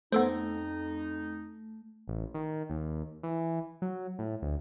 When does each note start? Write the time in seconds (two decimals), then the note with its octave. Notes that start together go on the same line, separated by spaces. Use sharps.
0.12 F2 A3 B3 D#4 A4 C5
2.08 A1
2.34 D#3
2.70 D#2
3.23 E3
3.82 F#3
4.19 A2
4.42 D2